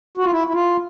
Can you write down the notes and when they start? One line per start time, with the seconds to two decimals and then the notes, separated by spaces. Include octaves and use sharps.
0.17 F#4
0.24 F4
0.32 E4
0.47 E4
0.54 F4